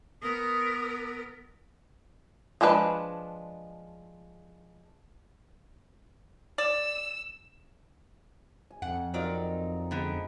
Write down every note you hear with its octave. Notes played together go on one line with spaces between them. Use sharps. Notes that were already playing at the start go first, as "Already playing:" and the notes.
B3 A#4 D#6
F3 G#3 D4 B4 B5
D5 E6
G#5
F2 F#5
F#3 C4 D#4 F4 A#4 D5
D3 G#3 B3 F#5 B5